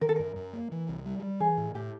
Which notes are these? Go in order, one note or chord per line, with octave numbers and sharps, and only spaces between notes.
D#3 A#4
A4
F#2 A#4
F#2
A#3
E3
C2
G3
G3
E3 G#4
A2
A2 G4